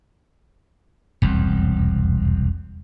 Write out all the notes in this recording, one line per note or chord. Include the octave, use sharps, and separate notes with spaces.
E1 C2 F2